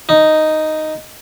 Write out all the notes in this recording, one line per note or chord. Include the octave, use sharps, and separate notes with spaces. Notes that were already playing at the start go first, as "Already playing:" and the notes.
D#4